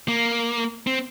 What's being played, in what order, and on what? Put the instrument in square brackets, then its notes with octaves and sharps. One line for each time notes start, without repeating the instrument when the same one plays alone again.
[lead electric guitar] A#3
C4